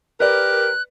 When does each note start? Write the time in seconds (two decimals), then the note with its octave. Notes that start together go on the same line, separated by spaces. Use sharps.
0.20 G4 A#4 B4 D5 F#6